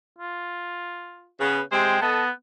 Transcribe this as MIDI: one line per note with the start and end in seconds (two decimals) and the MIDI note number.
0.19 1.31 65
1.41 1.61 49
1.41 1.61 59
1.41 1.61 71
1.72 2.01 48
1.72 2.01 56
1.72 2.01 72
1.72 2.01 79
2.01 2.31 59
2.01 2.26 69
2.01 2.26 75